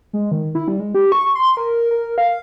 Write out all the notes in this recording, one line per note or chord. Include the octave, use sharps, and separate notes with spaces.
G#3
D#3
E4
G3
G#3
G4
C#6
C6
A#4
A#4
F5